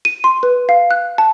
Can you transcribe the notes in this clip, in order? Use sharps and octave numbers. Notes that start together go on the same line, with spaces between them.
D#7
C6
B4
F5
F#6
A5